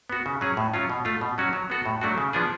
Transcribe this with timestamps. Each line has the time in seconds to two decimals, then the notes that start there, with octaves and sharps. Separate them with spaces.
0.10 B3 F#4
0.26 C#3
0.41 F#3 C#4 G#4
0.57 A2
0.74 F#3 C#4 F4
0.90 B2
1.05 A3 F4
1.21 B2
1.38 F#3 C#4 F#4
1.53 F#3
1.70 B3 F#4 A4
1.86 A2
2.01 F#3 A3 D4 F#4
2.18 C#3
2.33 F3 B3 D4 G#4